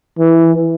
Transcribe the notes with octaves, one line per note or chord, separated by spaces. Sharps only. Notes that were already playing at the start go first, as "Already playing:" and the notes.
E3